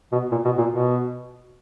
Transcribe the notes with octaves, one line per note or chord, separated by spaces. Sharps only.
B2
A#2
B2
A#2
B2